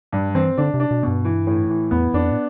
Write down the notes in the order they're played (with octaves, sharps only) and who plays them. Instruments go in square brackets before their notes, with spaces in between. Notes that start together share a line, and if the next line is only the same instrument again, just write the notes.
[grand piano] G2 [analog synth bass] G3
[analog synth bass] E3 [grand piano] C4
[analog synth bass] D3 [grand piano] D4
[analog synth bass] C3
[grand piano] D4
[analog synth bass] B2
[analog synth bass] G2 [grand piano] B2
[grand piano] E3
A2
E3
[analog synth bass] E2 [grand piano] B3
[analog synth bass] F2 [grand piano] D4
[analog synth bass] A2